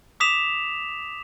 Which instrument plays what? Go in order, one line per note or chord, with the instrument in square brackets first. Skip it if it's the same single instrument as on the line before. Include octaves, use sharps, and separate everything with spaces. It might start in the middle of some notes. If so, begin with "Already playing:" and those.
[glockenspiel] D6 D#6 B6 E7 F7